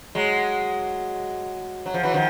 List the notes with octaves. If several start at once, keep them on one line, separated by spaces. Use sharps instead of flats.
F#3 G#3
F#3
F3
E3 F#3
D#3 F3